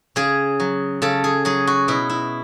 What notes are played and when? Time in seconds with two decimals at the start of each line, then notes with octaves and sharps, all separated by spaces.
0.16 C#3 G#4
0.60 F#3
1.02 C#3 A4
1.24 G#4
1.45 F#3 G#4
1.67 F#4
1.88 B2 E4
2.09 E4